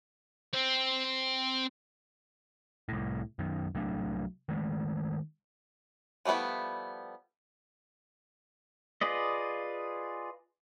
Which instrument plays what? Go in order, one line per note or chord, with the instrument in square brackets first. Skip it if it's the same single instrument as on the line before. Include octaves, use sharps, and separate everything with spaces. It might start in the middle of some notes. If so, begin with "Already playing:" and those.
[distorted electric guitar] C4
[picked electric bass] C2 A2
F#2 D#3
C2 F#3 A3 D4
D#3 G#3 A3
[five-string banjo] F3 G3 A3 B3 E4
[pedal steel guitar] F4 G#4 B4 D5 D#5